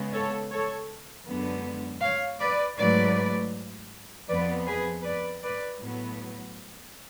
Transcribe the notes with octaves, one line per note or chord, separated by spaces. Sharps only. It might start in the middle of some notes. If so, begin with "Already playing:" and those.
Already playing: C#3 G#3 B3
A4 C#5
A4 C#5
F#2 D3 G#3 B3
C#5 F5
B4 D5
G#2 F#3 A3 B4 D5
F2 F3 B3 B4 D5
G#4 B4
B4 D5
B4 D5
A2 F#3 B3